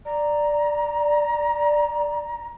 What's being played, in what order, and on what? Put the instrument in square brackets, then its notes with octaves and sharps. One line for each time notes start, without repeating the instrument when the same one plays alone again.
[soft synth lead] D5 [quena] A#5